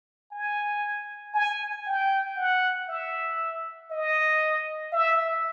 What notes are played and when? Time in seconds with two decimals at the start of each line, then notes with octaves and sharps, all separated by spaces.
0.32 G#5
1.34 G#5
1.86 G5
2.37 F#5
2.89 E5
3.91 D#5
4.92 E5